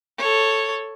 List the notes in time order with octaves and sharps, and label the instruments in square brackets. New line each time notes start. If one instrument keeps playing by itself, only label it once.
[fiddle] A4 C#5